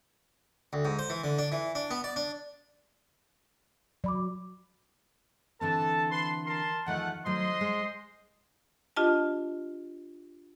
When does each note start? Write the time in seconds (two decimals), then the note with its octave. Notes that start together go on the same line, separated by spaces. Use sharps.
0.73 D2
0.85 G#2
0.99 C5
1.10 E3
1.24 D3
1.39 D4
1.52 E3
1.75 D4
1.91 B3
2.04 D5
2.16 D4
4.04 F#3 D5 B5 D6
5.61 D3 E3 C4 A4 A5
6.11 B4 A5 C6
6.46 A#4 A5 C6
6.86 E2 D#3 F3 A3 F#5
7.26 D#3 F#3 A3 C5 D#5 C6
7.61 G#3
8.96 D4 F4 G4 D#5 A5